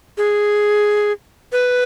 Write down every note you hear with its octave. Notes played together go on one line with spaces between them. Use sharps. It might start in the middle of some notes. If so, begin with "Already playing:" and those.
G#4
B4